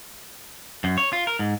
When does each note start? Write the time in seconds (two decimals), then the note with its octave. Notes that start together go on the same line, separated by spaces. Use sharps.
0.84 F#2
0.98 C#5
1.13 F4
1.27 A#4
1.39 G#2